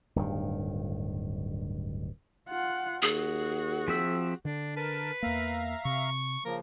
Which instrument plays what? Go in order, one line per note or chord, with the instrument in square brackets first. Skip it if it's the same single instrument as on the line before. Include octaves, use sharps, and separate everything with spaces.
[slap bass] D1 G2 D#3
[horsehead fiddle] F4 F#5
[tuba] D#2 [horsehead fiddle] F#4 [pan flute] G#4
[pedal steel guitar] F3 C4 E5
[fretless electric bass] D3 [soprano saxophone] D4
[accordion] A#4 A5 [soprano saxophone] B4
[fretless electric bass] E2 A#3 [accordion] E5 F5 A#5
[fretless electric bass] C3 [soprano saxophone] C#6
[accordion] C#3 F3 A#3 [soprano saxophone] A#4